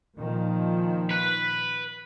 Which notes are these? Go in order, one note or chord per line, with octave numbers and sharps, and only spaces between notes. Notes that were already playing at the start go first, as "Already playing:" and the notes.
A#2 D#3 F3
B4